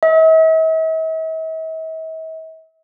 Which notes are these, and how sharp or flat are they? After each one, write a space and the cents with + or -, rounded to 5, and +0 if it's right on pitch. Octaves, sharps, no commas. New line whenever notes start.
E5 -45